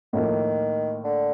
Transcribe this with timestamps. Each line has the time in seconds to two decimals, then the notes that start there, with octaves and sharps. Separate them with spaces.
0.13 A2 D#3 F3 A#3
1.04 D3